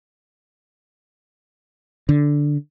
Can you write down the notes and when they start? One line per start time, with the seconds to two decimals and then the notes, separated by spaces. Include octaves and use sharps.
2.09 D3